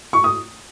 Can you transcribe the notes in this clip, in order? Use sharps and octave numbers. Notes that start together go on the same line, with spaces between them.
C#6
D#6